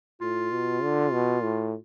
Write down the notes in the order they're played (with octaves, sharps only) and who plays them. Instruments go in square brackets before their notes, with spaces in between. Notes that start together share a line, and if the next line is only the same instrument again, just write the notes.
[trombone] A2 [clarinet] F4
[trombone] B2
D3
B2
A2